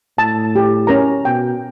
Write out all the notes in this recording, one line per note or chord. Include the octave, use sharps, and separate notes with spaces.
A2 A5
G4
C#4 A#4 A#5
B2 G5